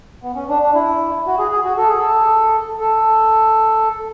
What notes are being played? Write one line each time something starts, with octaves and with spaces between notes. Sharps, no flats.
B3
C#4
D4
D4
E4
F#4
G#4
G#4
F#4
A4
G#4
A4
A4